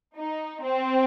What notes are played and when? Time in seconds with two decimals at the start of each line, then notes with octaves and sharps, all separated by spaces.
0.17 D#4
0.62 C4